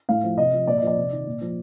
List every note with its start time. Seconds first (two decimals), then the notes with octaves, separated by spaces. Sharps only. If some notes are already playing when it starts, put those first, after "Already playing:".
0.09 A2 F5
0.23 F3
0.37 C3 D#5
0.53 F3
0.67 A#2 D5
0.78 D#5
0.82 F3 D5
0.97 C3
1.12 D#3
1.27 A#2
1.41 F3